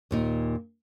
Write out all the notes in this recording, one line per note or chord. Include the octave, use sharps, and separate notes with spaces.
D#2 A#2 D#4